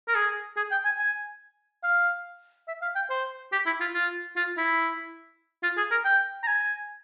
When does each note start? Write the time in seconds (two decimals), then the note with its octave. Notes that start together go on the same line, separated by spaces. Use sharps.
0.08 A#4
0.15 G#4
0.56 G#4
0.71 G5
0.85 G#5
0.99 G#5
1.83 F5
2.68 E5
2.82 F5
2.95 G5
3.10 C5
3.52 G4
3.66 E4
3.80 F4
3.94 F4
4.36 F4
4.57 E4
5.63 F4
5.77 G#4
5.91 A#4
6.05 G5
6.43 A#5
6.47 G#5